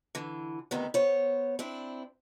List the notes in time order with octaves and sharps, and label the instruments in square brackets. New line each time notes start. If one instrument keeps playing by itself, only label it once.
[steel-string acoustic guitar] D3 E3
D2 C3 D#3 B3
B3 C5 C#5
C4 D4 E4